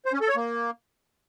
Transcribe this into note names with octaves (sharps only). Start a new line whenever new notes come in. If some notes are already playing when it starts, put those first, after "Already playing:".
C5
C#4
A4
C#5
A#3